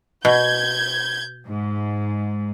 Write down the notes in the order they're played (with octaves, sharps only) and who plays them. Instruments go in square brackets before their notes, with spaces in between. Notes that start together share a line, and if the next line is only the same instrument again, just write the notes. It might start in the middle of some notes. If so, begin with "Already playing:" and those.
[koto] B2 [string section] G6 G#6
[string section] G#2